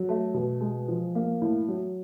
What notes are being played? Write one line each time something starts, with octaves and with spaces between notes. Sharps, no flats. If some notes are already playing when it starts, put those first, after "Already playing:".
Already playing: F#3
A3
B2
G#3
F3
A#3
A2
F#3